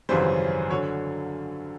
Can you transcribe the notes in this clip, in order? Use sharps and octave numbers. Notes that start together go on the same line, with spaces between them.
G#1 F#2 C#3 E3 G3 C5
D3 F#3 C#5